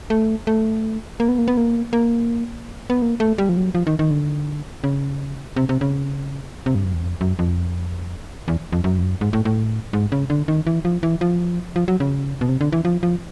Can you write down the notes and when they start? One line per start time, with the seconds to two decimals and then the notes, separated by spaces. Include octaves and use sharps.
0.10 A3
0.47 A3
1.20 A#3
1.29 B3
1.38 A#3
1.48 B3
1.57 A#3
1.93 A#3
2.90 B3
3.02 A#3
3.20 A3
3.38 G3
3.49 F3
3.57 F#3
3.75 F3
3.87 D#3
3.99 D#3
4.11 D3
4.84 C#3
5.56 C3
5.69 C3
5.81 C#3
6.66 C3
6.75 G2
6.84 F#2
6.94 E2
7.02 F2
7.21 F#2
7.39 F2
8.48 E2
8.72 F2
8.84 F#2
8.98 F2
9.02 F#2
9.21 G#2
9.33 A2
9.45 A2
9.93 G#2
10.12 C#3
10.30 D3
10.48 D#3
10.67 E3
10.85 F3
11.03 E3
11.21 F3
11.76 F3
11.88 F#3
12.00 C#3
12.41 B2
12.49 C3
12.61 D3
12.72 E3
12.85 F3
13.03 F3